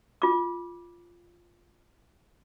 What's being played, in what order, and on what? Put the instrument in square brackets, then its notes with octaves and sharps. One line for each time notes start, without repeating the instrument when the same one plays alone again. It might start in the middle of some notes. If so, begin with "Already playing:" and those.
[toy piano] F4 D6